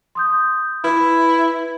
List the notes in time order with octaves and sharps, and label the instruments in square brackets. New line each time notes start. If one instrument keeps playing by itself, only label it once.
[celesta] C6 D#6 G6
[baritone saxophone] E4 [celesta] B4